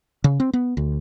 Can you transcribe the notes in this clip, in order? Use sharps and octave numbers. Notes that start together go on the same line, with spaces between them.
C#3
C4
B3
D2